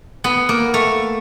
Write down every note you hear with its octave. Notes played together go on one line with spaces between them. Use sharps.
B3
A#3
A3